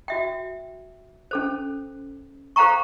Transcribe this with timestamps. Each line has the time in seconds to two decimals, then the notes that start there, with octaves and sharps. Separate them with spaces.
0.08 F#4 E5 G5
1.31 C#4 A4 C5
2.56 A4 C5 F5 G5 A#5 C#6